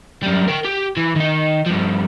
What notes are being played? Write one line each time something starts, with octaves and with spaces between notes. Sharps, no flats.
F#2 G3
A#4 G5
G4
E3
D#3 D#4
G2 F3